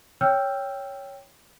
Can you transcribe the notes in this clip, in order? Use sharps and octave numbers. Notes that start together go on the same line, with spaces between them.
C#5 G5 E6 F6 G6